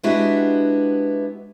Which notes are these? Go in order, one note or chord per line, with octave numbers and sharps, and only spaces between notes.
G#3 B3 D4 E4 F#4 G4